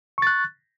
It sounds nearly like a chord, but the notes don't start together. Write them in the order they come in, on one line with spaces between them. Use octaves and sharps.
C#6 A6 F#6